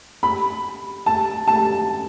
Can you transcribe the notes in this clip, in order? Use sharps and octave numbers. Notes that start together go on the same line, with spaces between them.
B5
A5
A5